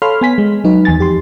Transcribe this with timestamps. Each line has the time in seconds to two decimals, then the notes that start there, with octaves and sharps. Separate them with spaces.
0.02 A4 C#5 F5 B5 C6 F6
0.21 B3 G#5 B6
0.38 G#3
0.64 F#3 D#4 B4
0.85 E2 G#5 A6
0.99 F2 G4 C6